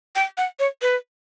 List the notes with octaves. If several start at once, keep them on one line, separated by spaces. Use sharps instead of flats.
G5
F#5
C#5
B4